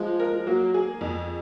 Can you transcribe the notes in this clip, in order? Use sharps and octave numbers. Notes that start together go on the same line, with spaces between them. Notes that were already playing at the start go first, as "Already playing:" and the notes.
Already playing: F3 G#3
A#4
F3
F#3 A#3
G#4
F2